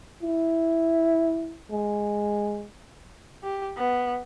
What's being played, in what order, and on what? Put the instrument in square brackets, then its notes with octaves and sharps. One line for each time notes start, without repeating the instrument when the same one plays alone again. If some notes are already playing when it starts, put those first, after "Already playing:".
[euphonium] E4
G#3
[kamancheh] G4
B3